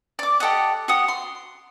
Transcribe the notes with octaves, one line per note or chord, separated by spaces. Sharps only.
D5 D6
G4 A4 D#5 F#5
F#4 G4 F#5 D#6
C6